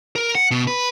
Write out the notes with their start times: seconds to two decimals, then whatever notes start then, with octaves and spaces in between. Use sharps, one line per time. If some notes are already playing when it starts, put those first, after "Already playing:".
0.15 A#4
0.35 F#5
0.51 B2
0.67 B4